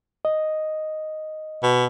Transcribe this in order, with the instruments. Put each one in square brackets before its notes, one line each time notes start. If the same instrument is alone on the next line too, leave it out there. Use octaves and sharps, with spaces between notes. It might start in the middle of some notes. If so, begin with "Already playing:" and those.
[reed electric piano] D#5
[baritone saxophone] B2